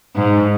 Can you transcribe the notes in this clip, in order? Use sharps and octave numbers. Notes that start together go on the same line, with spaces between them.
G#2